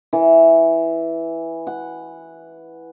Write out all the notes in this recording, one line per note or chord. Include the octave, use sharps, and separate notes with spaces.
E3
F#5